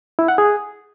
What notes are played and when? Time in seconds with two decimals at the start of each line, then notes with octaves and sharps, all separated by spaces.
0.19 E4
0.28 F#5
0.38 G#4